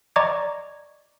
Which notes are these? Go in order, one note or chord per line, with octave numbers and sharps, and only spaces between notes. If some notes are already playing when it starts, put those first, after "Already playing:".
D5 D#5 A#5 C#6 D6 G#6